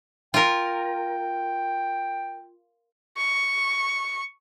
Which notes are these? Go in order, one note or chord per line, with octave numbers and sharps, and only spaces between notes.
F4 A#4 G5
C#6